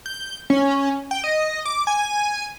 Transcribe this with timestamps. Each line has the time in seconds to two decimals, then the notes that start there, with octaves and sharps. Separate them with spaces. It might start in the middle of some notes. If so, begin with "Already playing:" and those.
0.06 G6
0.50 C#4
1.11 G5
1.24 D#5
1.66 D6
1.87 G#5